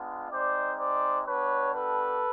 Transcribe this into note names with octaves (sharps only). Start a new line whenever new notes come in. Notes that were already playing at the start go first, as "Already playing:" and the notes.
Already playing: G#3 B3 D4 F4
G#3 C4 D#4 C5 D5
C5 D5
G3 B3 D4 B4 C#5
A4 B4